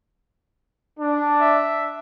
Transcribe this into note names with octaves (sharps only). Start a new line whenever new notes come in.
D4
E5